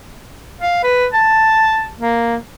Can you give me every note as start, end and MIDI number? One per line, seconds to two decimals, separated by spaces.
0.61 0.81 77
0.83 1.06 71
1.13 1.89 81
2.00 2.36 58